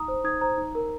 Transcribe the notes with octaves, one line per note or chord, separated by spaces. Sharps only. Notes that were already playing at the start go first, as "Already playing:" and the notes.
Already playing: D#4 A#5 D#6
C5
D#4 D#6 G#6
C5 A#5
D#4
A#4